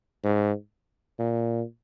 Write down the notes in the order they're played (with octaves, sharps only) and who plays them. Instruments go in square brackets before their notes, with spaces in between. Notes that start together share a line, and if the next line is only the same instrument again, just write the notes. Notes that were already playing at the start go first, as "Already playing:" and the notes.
[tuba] G#2
A#2